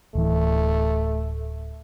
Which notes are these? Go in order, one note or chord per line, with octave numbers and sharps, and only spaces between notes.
D1 E3 A3